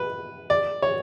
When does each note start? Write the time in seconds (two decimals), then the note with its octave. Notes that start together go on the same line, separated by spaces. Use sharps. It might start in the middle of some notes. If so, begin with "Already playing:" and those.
Already playing: B4
0.50 D5
0.82 C#5